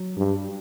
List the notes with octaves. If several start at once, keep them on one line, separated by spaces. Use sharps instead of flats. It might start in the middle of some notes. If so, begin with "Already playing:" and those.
Already playing: F#3
G2